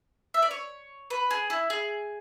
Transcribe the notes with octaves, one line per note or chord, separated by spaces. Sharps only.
E5
D5
C#5
B4
G#4
E4
G#4